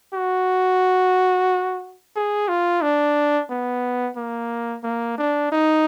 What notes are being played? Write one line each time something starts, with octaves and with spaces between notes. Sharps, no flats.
F#4
G#4
F4
D4
B3
A#3
A#3
D4
D#4